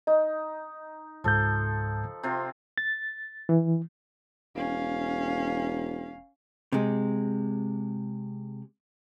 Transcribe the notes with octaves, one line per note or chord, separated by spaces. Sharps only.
D#4 D#5
C#2 G#2 F3 A4 G6
C3 C4 F4
A6
E3
E1 C#4 F5
C3 G#3